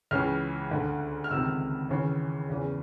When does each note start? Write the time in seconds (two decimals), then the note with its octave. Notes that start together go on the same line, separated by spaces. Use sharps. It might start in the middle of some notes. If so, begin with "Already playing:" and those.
0.11 C#2 C#3 E3 F6
0.71 D2 D3
1.24 F6
1.31 C#2 C3 D#3 E6
1.89 D#2 C#3 E3
2.49 E2 C#3 E3